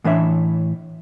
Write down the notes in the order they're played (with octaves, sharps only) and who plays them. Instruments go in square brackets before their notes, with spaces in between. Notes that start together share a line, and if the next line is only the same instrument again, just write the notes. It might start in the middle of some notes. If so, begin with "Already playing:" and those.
[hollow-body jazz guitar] A2 E3 D4 C#5 E5